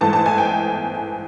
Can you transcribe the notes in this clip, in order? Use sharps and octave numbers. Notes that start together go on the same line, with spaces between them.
G#2 E3 A3 A5
A5
G#5
G5